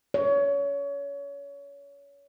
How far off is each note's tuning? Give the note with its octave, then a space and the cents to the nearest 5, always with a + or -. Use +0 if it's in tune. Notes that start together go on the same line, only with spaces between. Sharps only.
C#5 +25